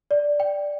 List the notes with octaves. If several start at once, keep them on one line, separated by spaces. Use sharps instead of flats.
D5
G5